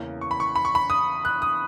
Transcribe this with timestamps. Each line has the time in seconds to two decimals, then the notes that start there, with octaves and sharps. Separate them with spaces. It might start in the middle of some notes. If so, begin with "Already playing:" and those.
Already playing: E2 C#3 E3 A#3 C#4
0.21 C#6
0.31 B5
0.40 C#6
0.56 B5
0.65 C#6
0.75 B5
0.90 D#6
1.25 F#6
1.42 D#6